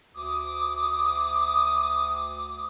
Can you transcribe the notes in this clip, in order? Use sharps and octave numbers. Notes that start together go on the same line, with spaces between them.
D2 D6 D#6